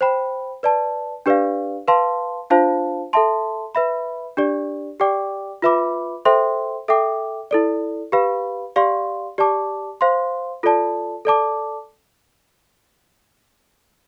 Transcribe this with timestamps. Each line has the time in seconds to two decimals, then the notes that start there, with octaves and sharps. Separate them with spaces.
0.01 C5 G5 B5
0.63 B4 D5 A5
1.26 D4 G4 B4 D5 F5
1.88 B4 F5 A5 C6
2.50 D4 F4 C5 F5 A5
3.13 A4 E5 A5 C6
3.75 B4 E5 B5
4.37 D4 G4 D5
5.00 G4 D5 G5 D6
5.62 F4 B4 E5 B5 D6
6.25 A4 C5 E5 G5 C6
6.88 A4 E5 G5 D6
7.51 E4 A4 D5
8.12 G4 B4 F5 B5
8.76 G4 D5 F5 C6
9.38 G4 D5 A5 D6
10.01 C5 F5 C6
10.63 F4 A4 D5 A5
11.25 A4 D5 A5 D6